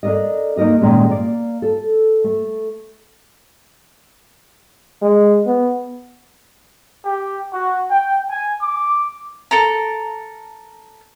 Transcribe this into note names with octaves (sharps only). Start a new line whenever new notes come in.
D4 A4 A#4 D5 D#5
A#3 D#4 A#4 D#5
A#2 D#3 G#3 C#4
A#3 D5
A4
A3
G#3
B3
G4
F#4
G5
G#5
D6
A4 A#4 A#5